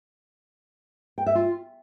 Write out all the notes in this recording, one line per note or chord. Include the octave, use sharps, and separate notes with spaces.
G5
E5
F4